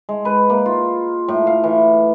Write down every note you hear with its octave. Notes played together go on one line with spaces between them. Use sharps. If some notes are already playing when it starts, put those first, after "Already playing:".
G#3
B4
A#3
F4
A2
F5
E3